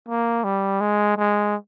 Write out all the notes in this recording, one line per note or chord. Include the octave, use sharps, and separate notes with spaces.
A#3
G3
G#3
G#3